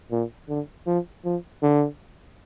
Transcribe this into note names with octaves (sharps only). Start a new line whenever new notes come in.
A#2
D3
F3
F3
D3